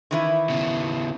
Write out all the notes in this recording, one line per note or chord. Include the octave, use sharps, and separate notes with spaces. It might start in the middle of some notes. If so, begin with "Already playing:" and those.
D#3 E3 E4
C#3 B3